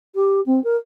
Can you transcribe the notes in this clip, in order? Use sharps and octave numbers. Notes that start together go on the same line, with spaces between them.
G4
C4
A#4